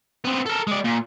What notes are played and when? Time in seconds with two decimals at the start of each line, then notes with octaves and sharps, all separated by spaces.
0.24 B3 C4
0.46 A4 A#4
0.67 G#3 D5
0.85 A#2